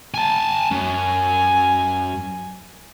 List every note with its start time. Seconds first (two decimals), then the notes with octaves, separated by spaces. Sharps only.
0.14 G#5 A5
0.71 F#2 G#5